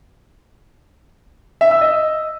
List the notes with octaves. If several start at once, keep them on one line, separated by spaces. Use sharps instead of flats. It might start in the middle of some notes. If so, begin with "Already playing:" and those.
E5
E6
D#5